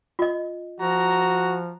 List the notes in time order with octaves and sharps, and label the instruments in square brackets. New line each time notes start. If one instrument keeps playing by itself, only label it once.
[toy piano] F4 D#5
[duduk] F3 [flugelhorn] F#4 [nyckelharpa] A#5